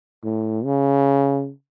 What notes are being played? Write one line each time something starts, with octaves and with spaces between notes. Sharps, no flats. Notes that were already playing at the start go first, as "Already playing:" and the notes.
A2
C#3